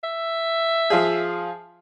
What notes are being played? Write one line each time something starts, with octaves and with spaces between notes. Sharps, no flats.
E5
F3 F4 G#4